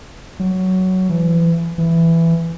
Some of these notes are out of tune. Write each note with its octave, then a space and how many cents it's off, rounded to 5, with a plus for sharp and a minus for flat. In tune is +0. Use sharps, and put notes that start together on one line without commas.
F#3 +10
E3 +30
E3 +10